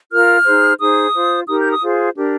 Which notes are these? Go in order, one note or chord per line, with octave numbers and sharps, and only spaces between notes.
F4 A#4 F6
D#4 G#4 C5
D#4 G#4 C5 D#6
F4 C5
D#4 G4 A#4 D#6
G6
D#6
F4 G#4 C5
D4 G4 A#4